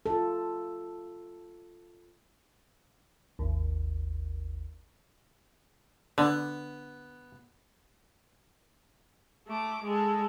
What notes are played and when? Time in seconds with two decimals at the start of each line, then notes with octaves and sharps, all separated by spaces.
0.06 F4 A4
3.39 G#1 D#2
6.18 D3 B3
9.48 A3 D6
9.85 G#3 A4